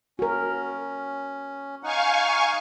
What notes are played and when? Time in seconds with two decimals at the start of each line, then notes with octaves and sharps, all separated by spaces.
0.19 C#4 F#4 A#4
1.83 D#4 F5 F#5 G#5 C#6